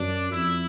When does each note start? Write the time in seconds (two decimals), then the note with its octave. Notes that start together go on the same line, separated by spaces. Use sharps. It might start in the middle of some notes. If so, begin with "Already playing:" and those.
Already playing: F#2 D4 D5
0.31 F2 E4 E5